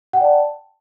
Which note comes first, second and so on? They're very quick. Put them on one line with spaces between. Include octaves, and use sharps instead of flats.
F#5 G5 D5 A5